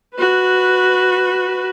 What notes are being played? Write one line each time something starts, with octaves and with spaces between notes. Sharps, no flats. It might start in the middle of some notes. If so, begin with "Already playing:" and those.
F#4 B4